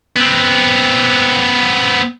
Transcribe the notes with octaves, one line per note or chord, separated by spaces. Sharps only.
B3 C4